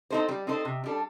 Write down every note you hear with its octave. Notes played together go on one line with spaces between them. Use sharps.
C4 D#4 A4 C5
G3
C4 D#4 A4 C5
C3
G3 D4 A4